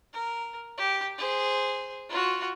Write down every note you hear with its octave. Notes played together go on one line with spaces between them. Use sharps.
A#4
G4
G#4 C5
F4 F#4